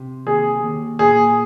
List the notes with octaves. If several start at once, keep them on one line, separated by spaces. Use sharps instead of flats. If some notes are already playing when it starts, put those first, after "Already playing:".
Already playing: C3
D#2 G#4
D#2
A#2 G#4